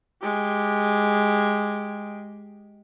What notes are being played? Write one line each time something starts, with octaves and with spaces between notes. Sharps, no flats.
G#3 G4